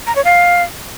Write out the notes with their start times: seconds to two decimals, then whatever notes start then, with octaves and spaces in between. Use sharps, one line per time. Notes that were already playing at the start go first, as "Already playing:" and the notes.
0.07 A#5
0.16 C#5
0.25 F5